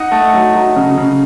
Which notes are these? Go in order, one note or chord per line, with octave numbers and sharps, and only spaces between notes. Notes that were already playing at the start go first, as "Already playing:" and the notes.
Already playing: D#4 D#5 F#5
A3
F#3
F#3
C#3
C#3